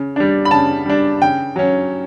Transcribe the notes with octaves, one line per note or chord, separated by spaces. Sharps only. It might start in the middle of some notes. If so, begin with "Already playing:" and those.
Already playing: C#3
G3 D4
B5
C#3 A5
G3 D4
C#3 G5
F#3 C#4